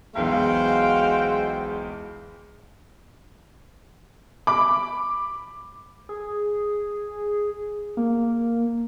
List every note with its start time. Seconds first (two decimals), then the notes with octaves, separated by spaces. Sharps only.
0.15 B1 E2 E3 G#3 F#4 C5 F5 G5
4.47 B5 D6
6.09 G#4
7.97 A#3